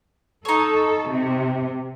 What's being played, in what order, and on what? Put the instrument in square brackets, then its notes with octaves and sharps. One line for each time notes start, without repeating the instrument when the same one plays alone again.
[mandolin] D#4 C#5 [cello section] A4
[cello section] C3